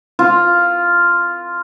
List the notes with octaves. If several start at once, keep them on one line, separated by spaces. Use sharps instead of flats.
F4